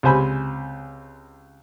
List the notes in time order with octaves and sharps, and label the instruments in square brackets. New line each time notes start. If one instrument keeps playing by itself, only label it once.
[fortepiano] C#2 C3 C5 G#5 B5